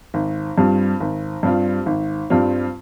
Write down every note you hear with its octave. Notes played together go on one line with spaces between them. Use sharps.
G#1
G2 G3 C4 F4
G#1
G2 G3 C4 F4
G#1
G2 G3 C4 F4